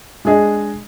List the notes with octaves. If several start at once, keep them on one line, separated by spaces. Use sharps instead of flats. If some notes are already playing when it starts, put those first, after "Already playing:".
G#3 D4 G#4 D#5